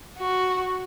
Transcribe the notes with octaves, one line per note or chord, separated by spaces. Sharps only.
F#4